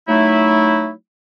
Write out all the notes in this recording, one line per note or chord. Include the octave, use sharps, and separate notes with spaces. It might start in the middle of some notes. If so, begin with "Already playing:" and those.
F#3 A3 D#4 E4